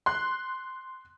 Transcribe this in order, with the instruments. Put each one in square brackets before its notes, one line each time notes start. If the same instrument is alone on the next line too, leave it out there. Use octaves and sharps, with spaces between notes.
[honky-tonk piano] C6 F#6